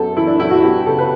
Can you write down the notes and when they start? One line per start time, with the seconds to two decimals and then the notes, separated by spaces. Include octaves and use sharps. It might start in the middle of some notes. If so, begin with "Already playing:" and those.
Already playing: F#2 B3 A4
0.16 E3 E4
0.27 D4
0.39 F#2 E4
0.51 F#4
0.62 B3 G4
0.86 C#3 A4
0.99 B4